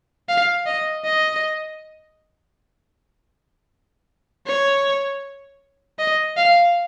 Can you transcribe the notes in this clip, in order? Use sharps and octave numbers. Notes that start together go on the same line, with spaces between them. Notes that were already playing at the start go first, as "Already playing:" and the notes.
F5
D#5
D#5
C#5
D#5
F5